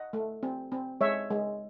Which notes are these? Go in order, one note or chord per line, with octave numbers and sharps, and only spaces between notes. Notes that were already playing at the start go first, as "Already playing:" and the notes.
Already playing: D#5 F#5
A3
C4
C4
G#3 C#5 E5
G#3